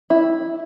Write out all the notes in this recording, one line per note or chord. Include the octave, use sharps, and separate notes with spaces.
E4